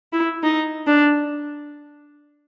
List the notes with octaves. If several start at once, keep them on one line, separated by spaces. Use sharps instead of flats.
E4
D#4
D4